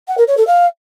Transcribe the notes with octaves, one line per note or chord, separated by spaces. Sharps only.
F#5
A#4
C#5
A4
F5